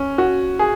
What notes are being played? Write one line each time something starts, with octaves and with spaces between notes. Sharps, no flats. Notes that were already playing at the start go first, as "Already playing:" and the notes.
Already playing: C#4
F#4
G#4